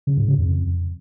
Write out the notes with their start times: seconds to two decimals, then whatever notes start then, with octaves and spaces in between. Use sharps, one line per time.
0.07 C#3
0.17 G#2
0.28 C#3
0.39 F2